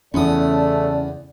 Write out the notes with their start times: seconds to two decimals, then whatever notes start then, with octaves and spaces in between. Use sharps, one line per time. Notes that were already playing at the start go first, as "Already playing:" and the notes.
0.14 E2 C#3 A3 C#4 D5 D#6